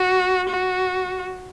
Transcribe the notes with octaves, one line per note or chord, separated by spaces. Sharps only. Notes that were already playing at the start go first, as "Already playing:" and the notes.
Already playing: F#4
F#4